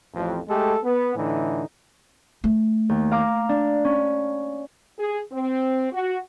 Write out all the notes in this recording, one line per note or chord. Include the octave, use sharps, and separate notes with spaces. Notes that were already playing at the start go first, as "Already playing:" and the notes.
A1 F2
G#3 A3 G4 A4
B3
A2 D3 E3 D#4
A3
D#2
F5 A#5 D6
D4
C#4
G#4
C4
F#4